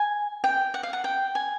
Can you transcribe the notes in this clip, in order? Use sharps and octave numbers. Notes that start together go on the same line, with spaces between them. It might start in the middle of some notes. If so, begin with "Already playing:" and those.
Already playing: G#5
G5
F#5
F5
F#5
G5
G#5